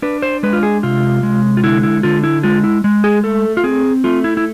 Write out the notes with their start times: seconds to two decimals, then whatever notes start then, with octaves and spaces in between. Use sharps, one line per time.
0.02 D4 B4
0.22 C5
0.43 G#3 B4
0.53 F4
0.63 G#4
0.83 C3 F4
1.23 G#3
1.57 F4
1.63 D3 E4
1.83 E4
2.03 D3 F4
2.24 E4
2.43 G#3 F4
2.64 E4
2.84 G#3
3.04 G#4
3.24 A3 A4
3.57 F4
3.64 C4 G#4
4.04 A3 F4
4.24 E4
4.37 E4